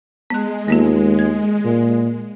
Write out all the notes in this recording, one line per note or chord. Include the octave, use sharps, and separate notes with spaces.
G#3 B3 F#6
D#2 A#3 B3 F4
G#6
A#2